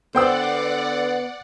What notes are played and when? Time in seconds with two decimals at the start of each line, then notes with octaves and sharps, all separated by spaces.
0.15 D3 B3 C5 D5 F#5 G5 E6